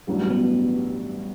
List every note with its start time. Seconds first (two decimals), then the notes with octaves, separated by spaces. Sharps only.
0.07 A1 G2 F#3
0.30 B3